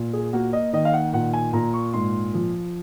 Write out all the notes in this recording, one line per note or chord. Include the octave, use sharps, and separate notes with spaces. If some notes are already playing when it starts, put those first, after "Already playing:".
Already playing: A#2
G#4
A#3 F#4
D#5
D#3 D#5
F5
F#5
A#2 F#5
G#5
A#2 A#5
C#6
G#2 C6
F3